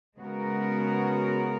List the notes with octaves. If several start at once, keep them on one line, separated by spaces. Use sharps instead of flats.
C#3 G#3 B3 F#4 A#4